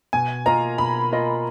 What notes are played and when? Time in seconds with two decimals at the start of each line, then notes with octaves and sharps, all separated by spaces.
0.13 B2 G#5
0.46 A#3 F4 A#4 D#5 A#5
0.78 B2 B5
1.12 A#3 F4 A#4 D#5